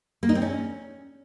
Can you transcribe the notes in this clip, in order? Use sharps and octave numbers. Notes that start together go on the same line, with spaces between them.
A#3
D#4
C4
C#4